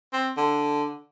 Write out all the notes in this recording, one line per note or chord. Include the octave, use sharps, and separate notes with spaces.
C4
D3